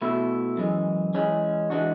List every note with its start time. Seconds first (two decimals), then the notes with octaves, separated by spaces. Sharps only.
0.02 B2 A3 E4
0.57 F#2 E3 G#3
1.14 E3 G#3 C#4
1.70 E3 G#3 D4 F#4